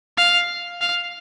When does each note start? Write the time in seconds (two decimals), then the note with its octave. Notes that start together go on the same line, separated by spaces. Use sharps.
0.17 F5
0.81 F5